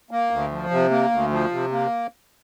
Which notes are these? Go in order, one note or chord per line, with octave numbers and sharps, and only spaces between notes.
A#3
D2
F3
C3
A#3
D2
F3
C3
A#3